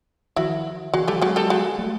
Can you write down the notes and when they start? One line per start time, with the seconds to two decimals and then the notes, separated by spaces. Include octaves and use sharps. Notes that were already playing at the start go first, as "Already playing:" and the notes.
0.36 D#3 F3 E4 F#4
0.94 D3 E3 F#4 G#4
1.07 F3 G3 G4 A4
1.21 F#3 G#3 F#4 G#4
1.36 G4 A4
1.50 F#4 G#4
1.78 G3 A3